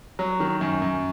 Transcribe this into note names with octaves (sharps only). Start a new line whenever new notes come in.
F#3
D#3
F#2
F#2